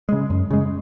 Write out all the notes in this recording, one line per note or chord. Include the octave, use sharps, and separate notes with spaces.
C#3 G#3
F#2
C#3 G#3